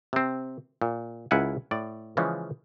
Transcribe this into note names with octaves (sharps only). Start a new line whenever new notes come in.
C3 C4
A#2
C#2 E4 A#4 F#5 G#5
A2 D5
C#3 E3 F3 G#3 C#4